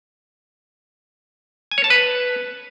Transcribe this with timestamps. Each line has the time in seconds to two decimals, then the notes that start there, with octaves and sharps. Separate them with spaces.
1.71 G#5
1.78 C#5
1.84 A5
1.90 B4